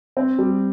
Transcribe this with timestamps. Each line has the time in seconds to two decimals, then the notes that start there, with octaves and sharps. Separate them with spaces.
0.17 C4
0.39 G3